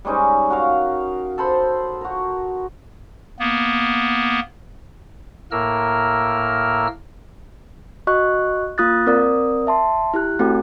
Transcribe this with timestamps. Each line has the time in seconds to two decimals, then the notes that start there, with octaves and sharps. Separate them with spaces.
0.05 G3 G#3 C#4 D#4
0.50 F#4 A#4 F5
1.38 A4 C5 B5 C6
2.01 F#4 A#4
3.39 A#3 B3
5.52 A2 A#3 A#4 E6 F6
8.07 F#4 D#5 C#6 F#6
8.78 A#3 F4 D#6 F#6 A6
9.07 C4 A#4 D5 D#6
9.67 E5 A5 C6
10.14 E4 G4 F#6
10.39 A3 C4 F#4 A4 G5